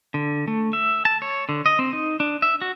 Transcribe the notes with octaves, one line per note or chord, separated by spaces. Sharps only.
D3
A3
E5
A5
C#5
D3
D#5
C4
D#4
D4
E5
F#4